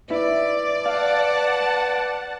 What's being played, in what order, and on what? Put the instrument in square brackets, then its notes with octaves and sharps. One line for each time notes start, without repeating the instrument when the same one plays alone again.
[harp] E4 [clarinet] B4 [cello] D5
[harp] F5 [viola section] F#5 A5